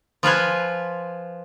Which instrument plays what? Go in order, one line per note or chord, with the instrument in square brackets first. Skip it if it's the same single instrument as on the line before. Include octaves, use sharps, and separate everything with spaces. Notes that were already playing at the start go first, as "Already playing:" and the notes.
[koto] F3 F4 B4 G#5